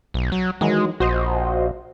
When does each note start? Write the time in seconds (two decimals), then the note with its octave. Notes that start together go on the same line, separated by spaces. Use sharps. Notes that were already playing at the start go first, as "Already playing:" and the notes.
0.14 B1
0.32 F#3
0.61 D#3 E3 F#3 G#3
1.00 A#1 F#4 C5 D#5